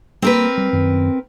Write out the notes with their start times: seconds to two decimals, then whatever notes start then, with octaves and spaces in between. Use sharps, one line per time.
0.22 G3 A#3 C4 A#4 B4
0.58 G3
0.73 F#2 D#3